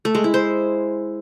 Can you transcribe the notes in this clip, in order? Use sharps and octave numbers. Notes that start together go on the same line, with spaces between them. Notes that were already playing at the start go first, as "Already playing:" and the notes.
A3
G#3
E4
C5